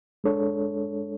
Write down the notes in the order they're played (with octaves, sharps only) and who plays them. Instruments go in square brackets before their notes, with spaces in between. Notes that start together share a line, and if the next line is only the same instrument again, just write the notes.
[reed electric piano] G#3 D4 A4 C#5